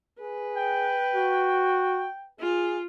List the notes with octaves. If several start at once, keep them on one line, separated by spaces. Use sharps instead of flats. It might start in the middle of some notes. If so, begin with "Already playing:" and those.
G#4 B4
G5
F#4
F4 G#4